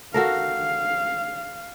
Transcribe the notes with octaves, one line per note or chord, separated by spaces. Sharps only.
F#4 A4 A#4 F5